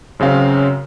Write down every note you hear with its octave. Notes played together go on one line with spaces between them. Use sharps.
F#2 C#3 C4 F5